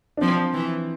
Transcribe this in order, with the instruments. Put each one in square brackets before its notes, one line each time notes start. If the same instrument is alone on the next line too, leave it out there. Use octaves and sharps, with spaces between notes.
[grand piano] D4
[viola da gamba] F3 [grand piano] C4
[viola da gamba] E3